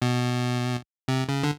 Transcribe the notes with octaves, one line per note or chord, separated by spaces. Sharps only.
B2
C3
C#3
D3